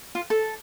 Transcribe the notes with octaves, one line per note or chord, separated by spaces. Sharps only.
F4
A4